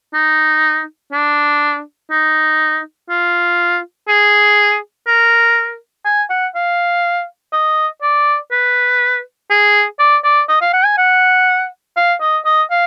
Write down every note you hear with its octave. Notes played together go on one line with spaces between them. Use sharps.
D#4
D4
D#4
F4
G#4
A#4
G#5
F#5
F5
D#5
D5
B4
G#4
D5
D5
D#5
F5
F#5
G#5
F#5
F5
D#5
D#5
F5